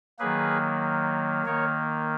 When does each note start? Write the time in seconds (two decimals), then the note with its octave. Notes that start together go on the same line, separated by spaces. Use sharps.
0.19 D#3 F#3 A#3 G#4 B4
1.46 D#3 A#3 A#4 C#5